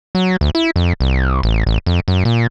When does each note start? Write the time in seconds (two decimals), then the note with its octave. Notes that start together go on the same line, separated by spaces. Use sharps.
0.15 F#3
0.41 D2
0.55 E4
0.76 F2
1.01 C2
1.43 A1
1.67 A1
1.86 F2
2.08 F#2
2.25 A#2